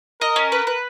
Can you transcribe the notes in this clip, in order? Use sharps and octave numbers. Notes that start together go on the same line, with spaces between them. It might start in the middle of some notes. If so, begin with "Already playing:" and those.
A#4 D#5
C#4
B4
B4